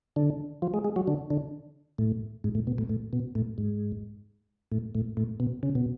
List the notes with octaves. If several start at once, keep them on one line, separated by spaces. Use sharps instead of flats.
D3
F3
G#3
G#3
F#3
D3
D3
A2
G#2
A2
B2
A2
A2
B2
A2
G#2
A2
A2
A2
B2
C#3
B2